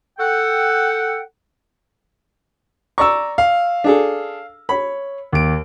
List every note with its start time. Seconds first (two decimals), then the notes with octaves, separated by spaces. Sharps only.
0.19 A4 F#5 G5
2.98 D5 A#5 C#6 E6
3.38 F5
3.84 D4 G#4 A4
4.69 C#5 B5
5.32 D#2 D7